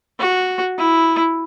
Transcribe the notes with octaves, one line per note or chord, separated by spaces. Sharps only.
F#4
E4